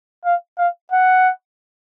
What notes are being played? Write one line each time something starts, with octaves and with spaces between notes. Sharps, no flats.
F5
F5
F#5